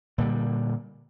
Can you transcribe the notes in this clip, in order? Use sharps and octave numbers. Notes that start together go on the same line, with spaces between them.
A#2 D3 G3